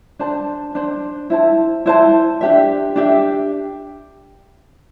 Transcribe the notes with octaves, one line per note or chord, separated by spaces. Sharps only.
D4 C5 A5
D4 C5 A5
E4 C5 A5
E4 C5 A5
D4 G4 E5
D4 G4 E5